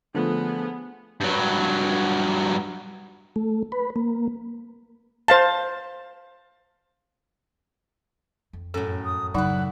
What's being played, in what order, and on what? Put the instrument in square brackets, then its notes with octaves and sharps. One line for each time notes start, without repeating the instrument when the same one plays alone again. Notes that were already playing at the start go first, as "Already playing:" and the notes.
[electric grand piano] D3 F3 A3 [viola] B3 G#4
[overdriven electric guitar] G2 F#3
[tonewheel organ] A3
B4
A#3
[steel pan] C5 F5 A5
[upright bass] F2
[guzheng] F#2 A2 [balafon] A4
[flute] D#6
[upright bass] F#2 C#3 [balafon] F#3 D#4 [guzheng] E4 B4 [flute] F#5